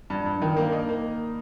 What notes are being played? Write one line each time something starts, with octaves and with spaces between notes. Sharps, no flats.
G2
G2
D#3
A#3
D#4
A#3